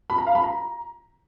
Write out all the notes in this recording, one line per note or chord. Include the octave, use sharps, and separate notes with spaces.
B5
A#5
F5
B5
A#5